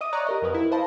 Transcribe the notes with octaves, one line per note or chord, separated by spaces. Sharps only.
D#5 E5 D6 D#6 D#7
C#5 D5 A#5 C#6 F#6
G4 A#4 D#5
F2 F#3 A#4 B4 D#6
E4
B4 C5 D#5 F5 A5 B5